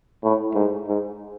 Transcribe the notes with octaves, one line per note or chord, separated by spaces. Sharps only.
A2
G#2
G#2